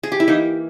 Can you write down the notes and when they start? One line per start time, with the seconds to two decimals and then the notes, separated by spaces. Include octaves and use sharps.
0.03 G#4
0.12 G4
0.20 E4
0.27 E3 A#3 D#4